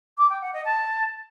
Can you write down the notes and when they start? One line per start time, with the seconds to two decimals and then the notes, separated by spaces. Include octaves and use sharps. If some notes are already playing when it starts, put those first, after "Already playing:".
0.17 D6
0.29 G5
0.41 F#5
0.53 D#5
0.65 A5